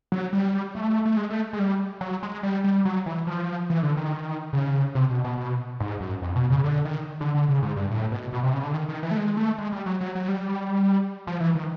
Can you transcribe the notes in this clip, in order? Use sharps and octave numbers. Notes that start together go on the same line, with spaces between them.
F#3
G3
A3
A3
G#3
A3
G#3
G3
F#3
G#3
G3
G3
F#3
E3
F3
E3
D3
D#3
C#3
C3
B2
B2
B2
G#2
F#2
F2
B2
C#3
D3
D#3
D3
D3
C#3
G#2
G2
A2
B2
B2
C3
C#3
D3
D#3
D#3
E3
A3
G#3
A3
G#3
G3
F#3
F#3
F#3
G3
F3
E3
D#3